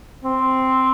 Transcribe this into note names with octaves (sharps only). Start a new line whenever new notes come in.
C4